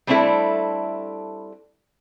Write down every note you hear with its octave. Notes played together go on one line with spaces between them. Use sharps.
G3 A3 C4 D4 E4 A4